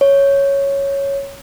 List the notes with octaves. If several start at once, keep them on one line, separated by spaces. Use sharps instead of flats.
C#5